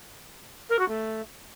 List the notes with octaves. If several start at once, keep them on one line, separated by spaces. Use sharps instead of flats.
A#4
F#4
A3